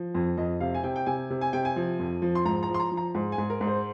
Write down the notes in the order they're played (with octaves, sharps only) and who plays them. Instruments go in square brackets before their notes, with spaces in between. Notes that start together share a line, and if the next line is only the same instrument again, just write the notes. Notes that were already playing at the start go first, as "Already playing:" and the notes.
Already playing: [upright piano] F3
F2
F2 D#5
C3 F5
G#5
C3 G5
G5
C3 G#5
C3
G#5
C3 G5
G#5
F3
F2
F3
C6
G#2 A#5
A#5
F3
C6
A#5
F3
A#5
G#2
G#5
G#2
A#4
G#2
C5